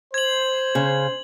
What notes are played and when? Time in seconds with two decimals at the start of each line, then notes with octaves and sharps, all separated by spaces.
0.14 C5 G#6 F#7
0.75 C#3